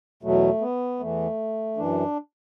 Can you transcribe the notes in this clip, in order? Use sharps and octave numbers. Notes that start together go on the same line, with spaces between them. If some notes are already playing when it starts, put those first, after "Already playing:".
E2 B2 F#3 A3
B3
E2 E3 A3
F#2 E3 D4